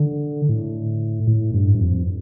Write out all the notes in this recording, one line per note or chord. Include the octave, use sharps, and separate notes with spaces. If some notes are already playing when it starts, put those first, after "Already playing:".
Already playing: D3
A2
A2
G2
G2
F2